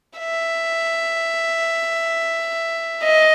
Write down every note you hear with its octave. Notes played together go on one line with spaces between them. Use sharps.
E5
D#5